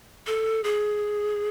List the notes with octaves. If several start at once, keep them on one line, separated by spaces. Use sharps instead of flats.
A4
G#4